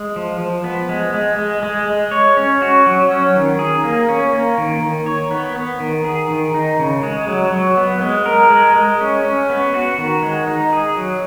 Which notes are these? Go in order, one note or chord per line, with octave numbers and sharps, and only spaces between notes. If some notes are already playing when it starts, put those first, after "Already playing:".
Already playing: G#3
F3
F3
B3
G#3
G#3
G#3
G#3
G#3
C#5
C#4
F#4
F#3
C#4
D#3
G#4
A#3
C#4
A#3
D#3
D#3
C#5
B3
B3
D#3
G#4
D#3
D#4
C#3
G#3
F#3
F#3
B3
G#3
A#4
G#3
G#3
C#4
C#4
B3
F#4
D#3
G#3
D#4
G#4
F#3